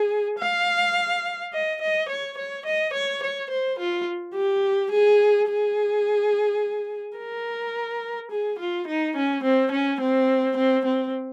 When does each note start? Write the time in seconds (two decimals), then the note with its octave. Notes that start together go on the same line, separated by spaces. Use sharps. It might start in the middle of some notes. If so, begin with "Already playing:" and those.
Already playing: G#4
0.39 F5
1.53 D#5
1.81 D#5
2.08 C#5
2.37 C#5
2.66 D#5
2.93 C#5
3.23 C#5
3.50 C5
3.79 F4
4.35 G4
4.91 G#4
5.48 G#4
7.17 A#4
8.31 G#4
8.58 F4
8.87 D#4
9.16 C#4
9.43 C4
9.71 C#4
10.01 C4
10.57 C4
10.85 C4